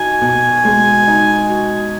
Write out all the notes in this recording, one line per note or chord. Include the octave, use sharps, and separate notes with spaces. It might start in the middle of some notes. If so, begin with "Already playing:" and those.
Already playing: D#4 F#4 G#5
B2
G#3
D#4
F#4